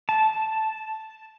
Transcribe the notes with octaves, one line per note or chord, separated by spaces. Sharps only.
A5